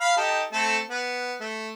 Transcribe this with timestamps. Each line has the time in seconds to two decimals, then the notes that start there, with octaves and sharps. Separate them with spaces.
0.01 F5 B5 F6
0.17 D#4 G4 A4
0.52 A3 C4 A4
0.90 B3
1.40 A3